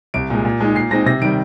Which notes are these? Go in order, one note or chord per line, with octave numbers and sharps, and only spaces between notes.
C2 D7
A#2 G#3
A#2
G#3 D#4
A#2 C7
G#3 C4 D#4 A#6
C3 A#6
D#3 G3 D7